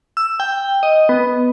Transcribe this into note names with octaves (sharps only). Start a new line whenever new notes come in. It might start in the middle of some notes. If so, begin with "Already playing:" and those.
E6
G5
D#5
B3